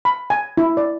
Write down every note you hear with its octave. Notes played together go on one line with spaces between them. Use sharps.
B5
G#5
E4
D5